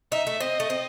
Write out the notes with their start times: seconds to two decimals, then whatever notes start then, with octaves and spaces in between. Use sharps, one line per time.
0.12 D#4 E5
0.27 A3
0.40 C4 D#5
0.60 A3
0.70 C4